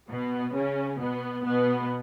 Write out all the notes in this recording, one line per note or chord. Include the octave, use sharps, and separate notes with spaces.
B2 B3
C#3 C#4
B2 B3
B2 B3